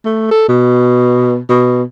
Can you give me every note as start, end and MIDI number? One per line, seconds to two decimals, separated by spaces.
0.05 0.26 57
0.31 0.46 69
0.48 1.38 47
1.49 1.83 47